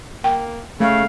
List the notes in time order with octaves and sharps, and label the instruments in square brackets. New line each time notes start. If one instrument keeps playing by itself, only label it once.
[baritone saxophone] A#3 [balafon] G5
[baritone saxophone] C#3 [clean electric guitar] A3 [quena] F5